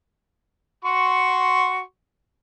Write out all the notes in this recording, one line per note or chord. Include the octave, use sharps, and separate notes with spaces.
F#4 C6 C#6